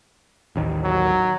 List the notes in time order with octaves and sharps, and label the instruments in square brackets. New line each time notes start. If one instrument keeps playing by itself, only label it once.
[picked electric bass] A1 D#2 D#3
[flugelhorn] F#3